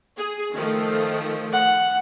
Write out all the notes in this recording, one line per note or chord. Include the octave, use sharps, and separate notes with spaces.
G#4
D#3 F3 A3
F#5